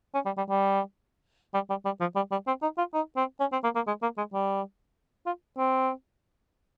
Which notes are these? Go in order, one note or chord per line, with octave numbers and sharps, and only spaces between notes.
C#4
G3
G3
G3
G3
G3
G3
F3
G3
G3
C4
D#4
F4
D#4
C4
C#4
C4
A#3
A#3
G#3
A#3
G#3
G3
F4
C4